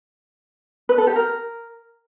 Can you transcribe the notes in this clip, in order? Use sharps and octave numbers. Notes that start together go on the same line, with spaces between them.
B4
A4
G4
A#4